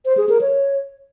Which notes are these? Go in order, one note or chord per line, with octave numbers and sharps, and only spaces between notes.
C5
G#4
A#4
C#5